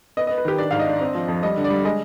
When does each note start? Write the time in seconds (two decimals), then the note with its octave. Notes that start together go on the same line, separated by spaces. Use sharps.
0.17 B3 D#5
0.27 B3 D#5
0.38 B4
0.45 D#3 G4
0.58 D4 D5
0.71 G#2 F5
0.80 D#5
0.87 D4
1.01 C4
1.15 F3
1.28 F2
1.43 G3 D#5
1.57 D3
1.64 D5
1.70 G3
1.85 G#3 D#5